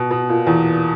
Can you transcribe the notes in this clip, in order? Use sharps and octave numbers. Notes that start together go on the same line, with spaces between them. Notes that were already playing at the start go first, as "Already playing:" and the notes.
Already playing: B2
B2
A#2
E2